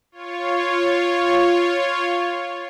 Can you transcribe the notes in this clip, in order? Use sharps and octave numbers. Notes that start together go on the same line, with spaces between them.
F4 C#5